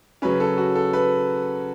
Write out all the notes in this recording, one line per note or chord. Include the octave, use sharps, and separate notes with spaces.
C#3 F#3 C#4 B4
A4
F#4
A4
B4